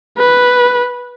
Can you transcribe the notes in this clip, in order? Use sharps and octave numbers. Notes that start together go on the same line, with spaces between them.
B4